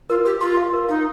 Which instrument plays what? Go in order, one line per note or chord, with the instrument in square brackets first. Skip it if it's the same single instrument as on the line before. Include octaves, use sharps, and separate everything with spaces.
[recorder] F4 [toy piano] A#4
[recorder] G4 [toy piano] A#4
[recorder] F4 [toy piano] C6
[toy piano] F5
A#4
[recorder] D#4 [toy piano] F5